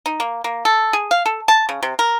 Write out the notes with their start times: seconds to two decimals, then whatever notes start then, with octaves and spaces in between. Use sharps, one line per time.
0.06 D#4
0.20 A#3
0.44 A#3
0.65 A4
0.93 G#4
1.11 F5
1.26 A4
1.48 A5
1.69 C#3
1.83 C3
1.99 A#4